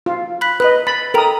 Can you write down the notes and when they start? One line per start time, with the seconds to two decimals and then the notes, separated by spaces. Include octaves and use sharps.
0.06 F4
0.41 B5 F#6 B6
0.60 B4 D#5 B5 F#6
0.87 B5 A6
1.14 A4 A#4 G5 A#5 D#6